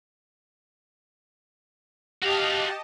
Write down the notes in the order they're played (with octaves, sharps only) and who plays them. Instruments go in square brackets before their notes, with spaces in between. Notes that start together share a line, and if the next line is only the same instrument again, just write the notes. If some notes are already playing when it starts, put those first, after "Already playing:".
[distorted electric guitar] F#4 F5 [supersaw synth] G4 D#5 A5